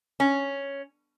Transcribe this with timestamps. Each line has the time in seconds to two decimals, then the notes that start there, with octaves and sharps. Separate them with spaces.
0.20 C#4